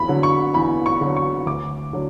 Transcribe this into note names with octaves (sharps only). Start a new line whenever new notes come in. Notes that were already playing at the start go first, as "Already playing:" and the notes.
Already playing: E2 B5
D3 F#3
C#6
E2 B5
C#6
D3 F#3
C#6
D2 D6
D3 F#3